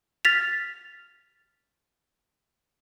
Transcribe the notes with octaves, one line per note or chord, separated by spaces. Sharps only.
F6 A6 B6 F7